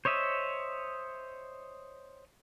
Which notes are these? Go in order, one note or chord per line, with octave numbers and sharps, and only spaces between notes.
C5 C#5 D#5 E5